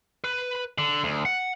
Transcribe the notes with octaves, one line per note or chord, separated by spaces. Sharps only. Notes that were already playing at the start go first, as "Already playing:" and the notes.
B4
D3
D2
F#5